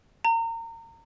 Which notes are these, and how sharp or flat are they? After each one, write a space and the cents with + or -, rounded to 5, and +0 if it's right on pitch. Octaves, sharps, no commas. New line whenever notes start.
A#5 -30